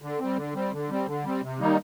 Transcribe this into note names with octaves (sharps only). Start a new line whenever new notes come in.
D3
G3 C4
D3
G3 C4
D3
G3 C4
D3
G3 C4
C3
D#3 G3 A#3 D#4